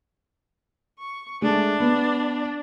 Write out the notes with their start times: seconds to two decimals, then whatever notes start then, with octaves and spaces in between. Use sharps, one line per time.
0.99 C#6
1.42 G#3 A3 D4
1.80 B3